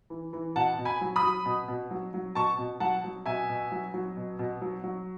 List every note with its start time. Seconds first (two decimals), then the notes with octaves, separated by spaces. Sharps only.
0.10 E3
0.33 E3
0.56 B2 F#5 A5
0.78 B2
0.85 G#5 B5
1.01 F#3
1.16 B5 D#6
1.23 F#3
1.46 B2
1.68 B2
1.91 F#3
2.14 F#3
2.35 B2 A5 C#6
2.58 B2
2.80 F#3 F#5 A5
3.04 F#3
3.26 B2 E5 G#5
3.49 B2
3.72 F#3
3.94 F#3
4.17 B2
4.39 B2
4.61 F#3
4.84 F#3